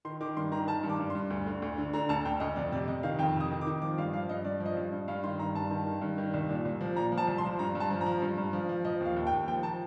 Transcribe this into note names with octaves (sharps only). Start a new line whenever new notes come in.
D#3 C6
D#3 D6
G2 C6
D#3 A#5
D#3 A5
G2
D6
G2
G2 C6
D2
D3
D2
D3
D3 A#5
D2 A5
D2 G5
D2 D#5
F2 D5
C3 D5
C3 D#5
D#3 F5
F2 G5
C3
D#6
D#3
D6
D#3
F3 D6
G2 F5
F3 F5
G2 D#5
G2 D5
F3
D#5
G2
G2
G2 F5
D#3 C6
G2 A#5
G2 A5
D#3
D#3
G2
D#3
C2
A#2
C2
F3
A#2 A#5
F3
A5
C2
C6
F3
G2 A#5
G2
A5
F3
A#5
F3
G2
G2
F3
F3
F3 D#5
D#2 F5
D#2
G5
D#2
F3 G5
F3 A5